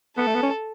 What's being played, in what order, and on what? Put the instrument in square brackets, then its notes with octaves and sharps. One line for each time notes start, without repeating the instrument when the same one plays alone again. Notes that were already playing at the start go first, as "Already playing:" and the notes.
[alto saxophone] B3 [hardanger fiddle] A4
[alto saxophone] A3
B3
C#4